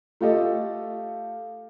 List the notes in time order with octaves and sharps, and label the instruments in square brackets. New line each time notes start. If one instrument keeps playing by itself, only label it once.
[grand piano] A3 F4 G4 A4 D#5